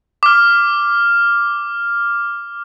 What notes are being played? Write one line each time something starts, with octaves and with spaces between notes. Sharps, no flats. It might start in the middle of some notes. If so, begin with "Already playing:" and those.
D6 F6